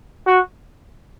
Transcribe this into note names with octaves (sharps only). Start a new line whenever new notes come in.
F#4